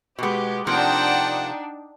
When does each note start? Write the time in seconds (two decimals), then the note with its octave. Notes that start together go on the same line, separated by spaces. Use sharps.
0.19 B2 G#3 B3 G4
0.67 C3 F3 A#3 D4 D#4 F#5 G5 A5